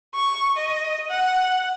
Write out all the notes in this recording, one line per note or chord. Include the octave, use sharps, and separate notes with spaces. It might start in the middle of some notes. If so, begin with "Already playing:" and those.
C#6
D#5
F#5